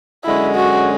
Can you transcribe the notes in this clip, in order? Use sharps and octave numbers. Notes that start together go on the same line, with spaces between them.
F#2 D3 G#3 C#4 E4
F#4